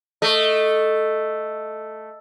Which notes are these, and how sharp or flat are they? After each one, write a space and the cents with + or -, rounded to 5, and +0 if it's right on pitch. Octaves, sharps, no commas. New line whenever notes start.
A3 +0 D#5 +0